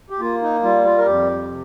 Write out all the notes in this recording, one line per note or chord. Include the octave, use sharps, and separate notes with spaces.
G4
A#3 F4
D#4
G3 F4
F4
A#4
F2 G4
C3